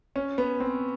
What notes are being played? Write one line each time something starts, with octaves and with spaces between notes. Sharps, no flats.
C#4
B3
C4